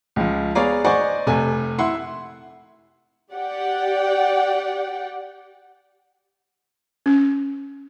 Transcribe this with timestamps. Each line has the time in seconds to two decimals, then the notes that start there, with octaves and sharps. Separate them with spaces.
0.16 C#2 F3
0.55 B3 G#4 C#5 D5 F5 A#5
0.85 C5 D5 D#5 F#5 G#5 C#6
1.27 F1 C3 A3 G#5
1.79 E4 E5 F#5 C6
3.32 G4 D5 F#5 G5
7.06 C#4